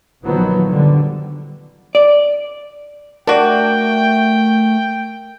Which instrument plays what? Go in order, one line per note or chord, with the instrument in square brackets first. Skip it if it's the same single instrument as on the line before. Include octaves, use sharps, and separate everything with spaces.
[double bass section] A#1 D#3 F3 F#3 B3
D3 G3
[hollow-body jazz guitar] D5
[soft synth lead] A3 [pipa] D4 F#4 [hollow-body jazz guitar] A#4 D5 [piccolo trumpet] G5